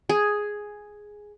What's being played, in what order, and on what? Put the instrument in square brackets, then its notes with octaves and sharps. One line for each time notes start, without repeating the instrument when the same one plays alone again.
[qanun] G#4